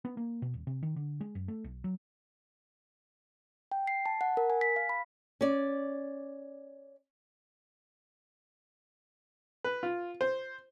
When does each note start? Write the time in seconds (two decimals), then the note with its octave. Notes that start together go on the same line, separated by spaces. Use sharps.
0.05 B3
0.17 A#3
0.42 B2
0.54 D#1
0.67 C3
0.83 D#3
0.96 D3
1.21 G#3
1.35 F#2
1.48 A3
1.64 B1
1.84 F#3
3.72 G5
3.87 C7
4.06 A5
4.21 F#5
4.37 A#4
4.50 G#5
4.61 B6
4.76 F5
4.89 B5
5.41 C#4 D5
9.64 B4
9.83 F4
10.21 C5